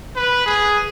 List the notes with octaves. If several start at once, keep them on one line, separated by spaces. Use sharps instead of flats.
B4
G#4